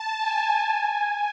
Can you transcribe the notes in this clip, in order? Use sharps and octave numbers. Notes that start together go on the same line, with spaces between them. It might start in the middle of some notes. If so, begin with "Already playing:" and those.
Already playing: A5
G#5
G#5